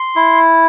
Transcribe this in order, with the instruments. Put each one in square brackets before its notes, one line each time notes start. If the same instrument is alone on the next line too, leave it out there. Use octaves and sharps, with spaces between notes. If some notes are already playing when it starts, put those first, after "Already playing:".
Already playing: [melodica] C6
E4